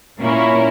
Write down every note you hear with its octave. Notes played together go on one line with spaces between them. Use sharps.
A#2 A#3 C#4 E4 A#4